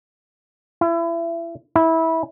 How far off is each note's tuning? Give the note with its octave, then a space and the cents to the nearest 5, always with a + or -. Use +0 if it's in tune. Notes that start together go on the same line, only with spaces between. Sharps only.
E4 +30
E4 -20